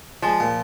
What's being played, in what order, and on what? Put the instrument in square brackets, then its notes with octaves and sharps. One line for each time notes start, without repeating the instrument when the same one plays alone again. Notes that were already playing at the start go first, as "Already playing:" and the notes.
[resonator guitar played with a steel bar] F3 [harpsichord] G#3
[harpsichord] A#2